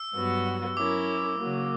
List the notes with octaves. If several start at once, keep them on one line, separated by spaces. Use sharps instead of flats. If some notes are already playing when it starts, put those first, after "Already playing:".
Already playing: E6
G2 F#3 B3 F#4
F#3 C#4 E4 A#4 D6
C#3 F#3 A#3